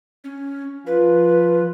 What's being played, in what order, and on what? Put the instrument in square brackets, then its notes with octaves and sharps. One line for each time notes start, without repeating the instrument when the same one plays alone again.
[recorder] C#4
[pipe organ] F3 F4 [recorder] B4